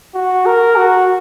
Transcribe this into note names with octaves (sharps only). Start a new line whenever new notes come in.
F#4
A#4
F#4